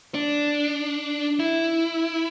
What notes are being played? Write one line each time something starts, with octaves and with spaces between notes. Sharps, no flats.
D4
E4